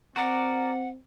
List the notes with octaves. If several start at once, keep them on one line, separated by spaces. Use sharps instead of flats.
C4 F#4 A#4 D5 F#5